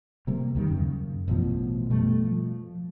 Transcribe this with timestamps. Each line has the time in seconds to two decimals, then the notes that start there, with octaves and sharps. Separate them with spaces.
0.27 C3 G3 A#3
0.55 D#2 D#3 G3
0.68 F#2 C#3
1.28 A1 F#2 B2 F3
1.90 B2 G3 A3
2.24 F3